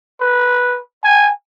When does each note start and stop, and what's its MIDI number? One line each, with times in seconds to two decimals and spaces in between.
0.21 0.79 71
1.03 1.29 80